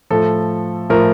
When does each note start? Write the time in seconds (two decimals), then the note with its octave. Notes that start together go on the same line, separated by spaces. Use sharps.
0.10 A2 F3 A4
0.90 A2 F3 A#4